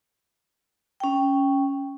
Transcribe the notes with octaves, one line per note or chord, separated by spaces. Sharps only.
C#4 G5